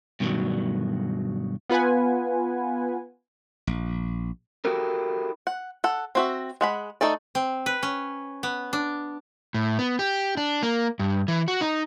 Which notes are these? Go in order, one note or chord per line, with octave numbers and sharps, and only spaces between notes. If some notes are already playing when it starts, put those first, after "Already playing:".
G2 B2 D#3 E3 F#3
B3 F4 B4 F#5 G#5
A#1
E4 F#4 G4 A4 A#4
F#5
A4 F#5
C4 F#4 E5
G#3 F#5 B5
A3 D#4 A4 D5
C4
B4
C#4
B3
D4
A2
B3
G4
D4
A#3
G2
E3
F#4
D#4